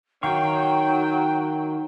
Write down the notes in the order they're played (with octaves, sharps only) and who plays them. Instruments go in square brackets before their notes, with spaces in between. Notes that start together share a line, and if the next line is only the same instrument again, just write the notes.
[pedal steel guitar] D#3 F5 C#6 [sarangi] F#3 [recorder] G5